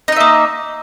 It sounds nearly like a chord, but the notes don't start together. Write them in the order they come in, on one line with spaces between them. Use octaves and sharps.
D#4 D#5 E5 A#3